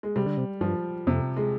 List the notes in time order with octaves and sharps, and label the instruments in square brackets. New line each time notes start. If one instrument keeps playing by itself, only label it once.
[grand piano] G#3
[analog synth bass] C3 [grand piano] G3
[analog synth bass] D3
C3
[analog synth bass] G2 [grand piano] F3
[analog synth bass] F2 [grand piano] C3
[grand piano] G#3